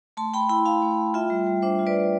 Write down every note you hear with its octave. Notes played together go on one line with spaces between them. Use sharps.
A3 A5 C6
A3 G5 B5
E4 G5 B5
E4 F5 A5
A3
A3
F4 E5 G5
G3
G3
D4 C5 E5
F4
B4 D5
G3